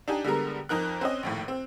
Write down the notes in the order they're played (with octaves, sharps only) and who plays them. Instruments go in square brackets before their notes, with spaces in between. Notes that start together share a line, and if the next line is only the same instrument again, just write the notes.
[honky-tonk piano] D4 D#4 G4 G#5
D3 G3 G#3 B3 A#4
F2 D#4 A#4 F#6
C4 C#4 D#5
A#1 D#2 A2
C4